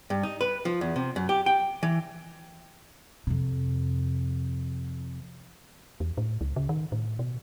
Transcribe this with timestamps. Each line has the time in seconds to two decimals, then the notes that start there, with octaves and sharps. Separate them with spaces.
0.10 G2
0.23 D#4
0.41 B4
0.65 F3
0.81 E2
0.96 C3
1.16 F#2
1.29 G4
1.46 G5
1.83 E3
3.27 F2 C3
6.00 E2
6.18 A2
6.41 C#2
6.56 C#3
6.69 D#3
6.92 A2
7.19 B2